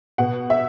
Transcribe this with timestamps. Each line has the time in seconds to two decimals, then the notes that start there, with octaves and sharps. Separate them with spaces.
0.18 B2 F#5
0.50 E5